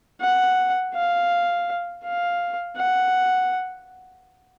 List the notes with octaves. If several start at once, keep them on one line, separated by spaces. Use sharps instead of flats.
F#5
F5
F5
F#5